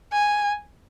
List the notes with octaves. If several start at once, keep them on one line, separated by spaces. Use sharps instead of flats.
G#5